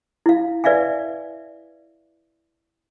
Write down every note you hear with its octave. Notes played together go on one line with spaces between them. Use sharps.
E4 F5
B4 D5 E5 F5 G#5